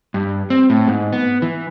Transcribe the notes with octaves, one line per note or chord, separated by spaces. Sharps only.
G2
C4
A2
G#2
B3
E3